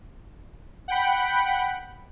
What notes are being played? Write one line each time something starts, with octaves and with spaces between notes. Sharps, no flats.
F#5 G5 B5